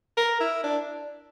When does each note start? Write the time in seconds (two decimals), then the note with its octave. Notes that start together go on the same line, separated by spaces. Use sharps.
0.17 A#4
0.40 E4
0.63 D4